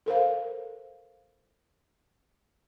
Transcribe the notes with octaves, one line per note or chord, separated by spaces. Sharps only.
A4 A#4 C5 F5